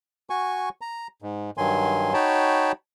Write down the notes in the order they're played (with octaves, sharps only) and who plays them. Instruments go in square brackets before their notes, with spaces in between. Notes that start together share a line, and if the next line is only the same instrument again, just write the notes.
[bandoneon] F#4 G#5 C#6
A#5
G#2
G2 D#3 F#3 G#5 C6
D#4 F#4 C#5 G5 A5 B5